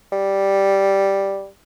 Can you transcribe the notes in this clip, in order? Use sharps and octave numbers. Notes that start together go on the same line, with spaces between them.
G3